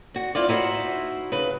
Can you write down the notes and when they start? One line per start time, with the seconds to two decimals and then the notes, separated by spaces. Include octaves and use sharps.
0.14 D3 F#4
0.35 C4 E4 F4 D5
0.49 D#4 E4 F#4 B4 C5
1.32 C#3 B4